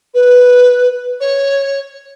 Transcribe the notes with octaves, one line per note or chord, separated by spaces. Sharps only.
B4
C#5